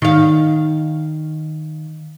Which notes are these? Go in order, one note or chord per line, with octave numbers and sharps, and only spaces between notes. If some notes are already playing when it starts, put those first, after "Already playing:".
D#3 F5